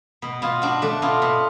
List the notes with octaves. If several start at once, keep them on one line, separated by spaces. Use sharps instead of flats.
B2
B2 F4
D4 F#4
A3 D4
B2 F4
B2